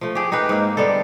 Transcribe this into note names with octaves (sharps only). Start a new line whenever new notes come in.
F3 A3
G4 G#4
D#4 G4 G#4 B4
G#2 A#3
D3 G3 B3 A4